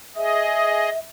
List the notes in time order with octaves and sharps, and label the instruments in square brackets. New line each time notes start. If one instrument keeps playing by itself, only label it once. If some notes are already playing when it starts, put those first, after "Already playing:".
[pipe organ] G#4 D#5 [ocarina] E5